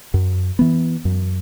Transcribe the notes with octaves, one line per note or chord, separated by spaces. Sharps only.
F#2
E3 B3
F#2